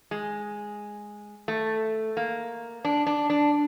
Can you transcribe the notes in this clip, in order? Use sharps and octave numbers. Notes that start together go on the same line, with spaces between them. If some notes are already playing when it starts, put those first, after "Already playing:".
G#3
A3
A#3
D4
D4
D4